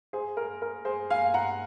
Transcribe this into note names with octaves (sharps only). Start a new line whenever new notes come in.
G#4 C5
A#4
A#4
G#4 C5
F5 G#5
F#5 A#5